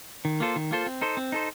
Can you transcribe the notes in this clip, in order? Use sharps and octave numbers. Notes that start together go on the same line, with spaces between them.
D#3
A#3 F4 A4 C5
D#3
A#3 F4 A4 C5
C4
D#4 A4 C5
C4
D#4 A4 C5